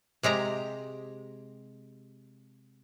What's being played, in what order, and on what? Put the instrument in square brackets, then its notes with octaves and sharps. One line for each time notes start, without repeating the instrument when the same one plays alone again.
[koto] C3 G#3 G4 A#5